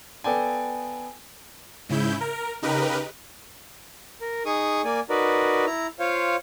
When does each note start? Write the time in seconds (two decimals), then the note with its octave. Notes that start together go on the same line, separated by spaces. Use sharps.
0.24 B3 A4 D5 G5 G#5
1.89 G#2 C#3 E4 G6
2.21 A#4
2.62 C#3 D#4 G4 A#4 B4
4.21 A#4
4.46 D#4 G#4 C#6 D#6
4.84 A#3 D5 G#5
5.10 D#4 F#4 A#4 B4 D5
5.66 E4 A#5
6.00 F4 C5 C#5 F5